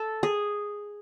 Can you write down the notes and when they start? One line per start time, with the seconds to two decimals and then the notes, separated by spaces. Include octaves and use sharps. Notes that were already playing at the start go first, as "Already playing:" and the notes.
Already playing: A4
0.23 G#4